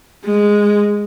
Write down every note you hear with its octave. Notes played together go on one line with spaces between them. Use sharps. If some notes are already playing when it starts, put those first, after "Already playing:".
G#3